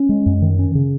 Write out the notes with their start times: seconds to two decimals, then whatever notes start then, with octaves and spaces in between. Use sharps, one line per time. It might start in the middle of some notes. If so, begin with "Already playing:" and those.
Already playing: C#4
0.09 G#3
0.26 F#2
0.42 D#3
0.59 C#4
0.75 C#3